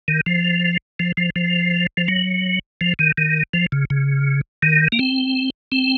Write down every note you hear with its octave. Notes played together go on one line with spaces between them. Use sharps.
D#3
F3
F3
F3
F3
F3
F#3
F3
D#3
D#3
F3
C#3
C#3
D#3
A#3
C4
C4